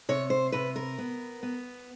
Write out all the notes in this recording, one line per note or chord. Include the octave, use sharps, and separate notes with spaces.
C3 C#5
C5
C3 B4
A#4
B3
B3